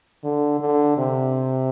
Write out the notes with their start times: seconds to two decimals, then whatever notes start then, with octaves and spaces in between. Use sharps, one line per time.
0.24 D3
0.60 D3
0.98 C3